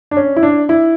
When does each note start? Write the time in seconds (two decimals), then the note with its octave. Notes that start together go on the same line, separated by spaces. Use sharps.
0.11 D4
0.17 C#4
0.36 E4
0.43 D4
0.69 E4